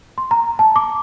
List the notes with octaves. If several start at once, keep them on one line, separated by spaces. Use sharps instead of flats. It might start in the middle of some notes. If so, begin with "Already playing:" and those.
C6
A#5
A5
D6